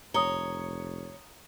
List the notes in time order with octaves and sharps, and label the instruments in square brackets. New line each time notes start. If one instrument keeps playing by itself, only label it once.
[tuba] F1 [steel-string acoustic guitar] C#5 [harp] A#5 [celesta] D#6 G7